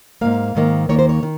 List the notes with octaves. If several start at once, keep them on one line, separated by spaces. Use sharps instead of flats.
G#2 D#3 A#3 F5
G#2 D#3 A#3
D#2 D#3 A#3 C#5
C5
C#5
D#3